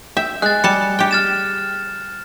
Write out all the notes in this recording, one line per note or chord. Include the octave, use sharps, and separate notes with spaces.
E5 G5
G#3 G#4 F#6 A6
G3 A5 C#7
G4 G5
F6 A6 E7